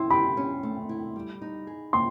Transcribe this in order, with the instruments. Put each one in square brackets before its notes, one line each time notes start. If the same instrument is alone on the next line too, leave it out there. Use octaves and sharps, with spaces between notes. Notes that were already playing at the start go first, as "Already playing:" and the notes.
Already playing: [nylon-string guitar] E4 [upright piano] C6
[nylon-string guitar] G4 [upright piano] B5
[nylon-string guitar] C#4
A3
E4
G3
D#4
G#4
[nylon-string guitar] A#3 [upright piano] C6